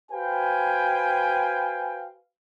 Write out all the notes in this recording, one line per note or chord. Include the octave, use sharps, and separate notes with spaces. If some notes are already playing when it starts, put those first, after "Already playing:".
F#4 B4 C5 F5 G5 G#5